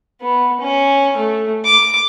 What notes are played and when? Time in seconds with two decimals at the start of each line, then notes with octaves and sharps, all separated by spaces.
0.21 B3
0.61 C#4
1.17 A3
1.65 D6